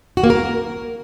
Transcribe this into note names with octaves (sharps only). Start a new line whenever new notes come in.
F#4
A#3
A#4